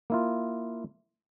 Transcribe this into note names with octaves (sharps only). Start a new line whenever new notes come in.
A#3 E4 F4